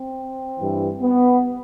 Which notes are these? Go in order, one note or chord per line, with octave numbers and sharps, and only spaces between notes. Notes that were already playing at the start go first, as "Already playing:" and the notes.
Already playing: C4
G2 E3
B3